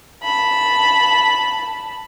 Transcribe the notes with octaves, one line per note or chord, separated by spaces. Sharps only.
A5 B5